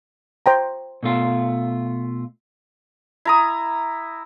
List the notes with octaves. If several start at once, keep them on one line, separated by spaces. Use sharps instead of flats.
C5 G5 A#5
B2 A3 F4
E4 A#5 D#6